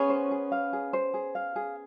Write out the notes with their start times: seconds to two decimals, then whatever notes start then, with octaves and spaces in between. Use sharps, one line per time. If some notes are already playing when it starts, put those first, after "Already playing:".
Already playing: B3 C#4 G#4
0.10 C5
0.31 G#4
0.52 F5
0.73 G#4
0.93 C5
1.14 G#4
1.35 F5
1.56 G#4